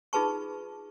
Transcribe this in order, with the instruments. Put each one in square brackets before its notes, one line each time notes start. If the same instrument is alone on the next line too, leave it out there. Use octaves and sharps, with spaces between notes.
[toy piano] D#4 F4 G#4 B4 A5 C#6